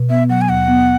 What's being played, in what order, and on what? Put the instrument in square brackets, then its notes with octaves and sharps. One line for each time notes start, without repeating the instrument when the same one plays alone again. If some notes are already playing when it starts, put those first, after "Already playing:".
Already playing: [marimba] B2
[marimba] B3 [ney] E5
[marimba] F#3 [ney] F#5
[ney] G#5
[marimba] D#2 [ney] F#5
[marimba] B3